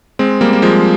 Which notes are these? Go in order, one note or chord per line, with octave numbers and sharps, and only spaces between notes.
G#3 C4
G3 A#3
A#3
F3 G#3